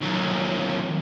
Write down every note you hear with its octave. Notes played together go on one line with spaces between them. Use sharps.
D#2 F#3